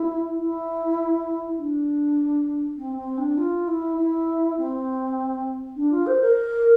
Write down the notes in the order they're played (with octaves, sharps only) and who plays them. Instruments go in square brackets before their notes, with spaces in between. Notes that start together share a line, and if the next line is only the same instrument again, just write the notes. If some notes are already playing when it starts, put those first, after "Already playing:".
Already playing: [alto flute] E4
E4
D4
C4
C4
D4
F4
E4
E4
C4
D4
F4
C5
A#4